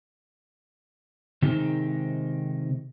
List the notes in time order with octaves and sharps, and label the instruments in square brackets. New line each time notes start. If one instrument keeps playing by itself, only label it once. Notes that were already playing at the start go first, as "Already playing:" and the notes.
[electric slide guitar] C3 D#3 G#3 C4 D#4 G4